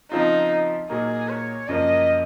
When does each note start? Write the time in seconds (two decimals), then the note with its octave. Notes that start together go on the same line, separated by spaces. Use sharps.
0.11 C#3 F3 C4 D#4 F4
0.89 A#2 F#3 A#3 D#4 G#4
1.29 C#5
1.68 F#2 C#3 F3 A#3 D#5